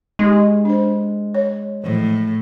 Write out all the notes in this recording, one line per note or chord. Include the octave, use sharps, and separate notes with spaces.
G#3 D#4 G4
D4 C5
C#5
A2 E3 F3